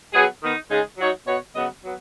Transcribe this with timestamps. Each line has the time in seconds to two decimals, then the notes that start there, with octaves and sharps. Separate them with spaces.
0.13 F#3 B3 G#4
0.42 D#3 B3 D#4
0.70 C#3 G#3 D#4 G#4
0.98 F#3 D#4 F#4 C#5
1.26 B2 B3 F#4 C#5
1.55 C#3 F#3 B3 F#4 D#5
1.84 F#3 B3